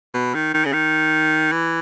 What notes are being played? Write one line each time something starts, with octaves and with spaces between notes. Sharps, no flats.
B2
D#3
D#3
C#3
D#3
E3